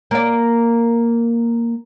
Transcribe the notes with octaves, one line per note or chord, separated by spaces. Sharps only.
A#3 D5